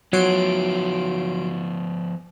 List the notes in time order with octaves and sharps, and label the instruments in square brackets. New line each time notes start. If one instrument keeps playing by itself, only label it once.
[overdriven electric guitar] F3 B3 [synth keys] F#3 C6 D7